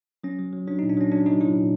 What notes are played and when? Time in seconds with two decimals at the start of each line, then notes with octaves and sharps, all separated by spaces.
0.24 F#3 C#4
0.38 F#3
0.53 F#3
0.67 F#3 D4
0.79 A#2 D#4
0.90 D4
0.97 F#3 C#4
1.12 F#3 D4
1.26 F#3 D#4
1.41 F#3 E4
1.56 A#2